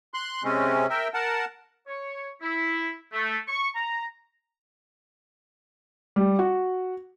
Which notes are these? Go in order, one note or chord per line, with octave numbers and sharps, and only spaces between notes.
C6 F#6
C3 G#3 C4 C#4
A#4 E5 G5
A#4 F#5 A5
C#5
E4
A3
C#6
A#5
G3
F#4